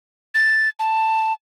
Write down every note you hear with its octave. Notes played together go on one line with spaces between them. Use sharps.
A6
A5